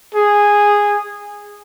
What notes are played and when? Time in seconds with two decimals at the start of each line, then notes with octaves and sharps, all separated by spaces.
0.15 G#4